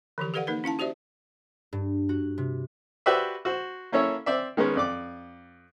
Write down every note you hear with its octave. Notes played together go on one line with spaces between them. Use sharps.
D3 E3 F3 G4
G4 A4 B4 D5 F5 F#5
A#3 D#4 A#4 B4
C#4 E4 F5 A5
F#4 G4 C5 D5 E5
G2
F#4
C3
F#4 G4 B4 C5 D5 E5
F#4 C5
A#3 C#4 E4 A4 C#5
C4 D5 E5
D#3 G#3 B3 C#4
F2 D5 D6